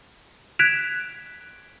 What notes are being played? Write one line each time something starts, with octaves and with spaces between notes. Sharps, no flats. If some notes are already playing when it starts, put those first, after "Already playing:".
F#6 G#6 B6 D7 E7 F7